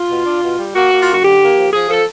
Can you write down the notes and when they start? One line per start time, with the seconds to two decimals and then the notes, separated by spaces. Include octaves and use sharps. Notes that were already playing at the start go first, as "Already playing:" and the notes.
Already playing: F4
0.10 B2
0.26 D4
0.42 B2
0.59 G3
0.75 A#3 F#4
0.91 A#3
1.03 F4
1.08 F#2 F#4
1.24 D3 G4
1.40 A#3
1.57 F3
1.73 F3 G#4
1.89 F3 A4